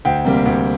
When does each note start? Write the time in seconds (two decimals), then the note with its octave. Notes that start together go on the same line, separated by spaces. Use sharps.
0.05 D2 G5
0.25 C3 G3 A#3
0.46 D2